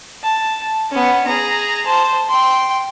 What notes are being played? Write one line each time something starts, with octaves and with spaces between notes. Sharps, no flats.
A5
B3 C#4
G#4 A#5
C5 A5
G5 C6